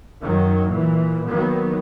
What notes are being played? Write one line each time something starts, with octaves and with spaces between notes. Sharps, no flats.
F#2 D#3 F#3
A#2 E3
D#3 F#3 A#3 B3